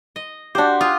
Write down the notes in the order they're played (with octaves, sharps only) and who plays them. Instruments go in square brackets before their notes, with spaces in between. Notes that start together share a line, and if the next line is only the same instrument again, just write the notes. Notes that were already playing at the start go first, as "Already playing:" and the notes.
[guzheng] D#5
[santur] D4 G4 [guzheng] F#4 C5
[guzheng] F4 [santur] D#6